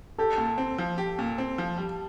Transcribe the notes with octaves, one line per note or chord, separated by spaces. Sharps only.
G4 A4
A#2
C4
F3
G4
A#2
C4
F3
G3